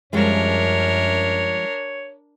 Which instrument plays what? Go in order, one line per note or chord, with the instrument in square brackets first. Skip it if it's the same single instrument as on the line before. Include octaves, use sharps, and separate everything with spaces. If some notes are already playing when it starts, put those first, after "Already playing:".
[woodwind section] F#2 [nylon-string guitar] F3 G3 G#3 [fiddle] D4 A#4 [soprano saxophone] C#5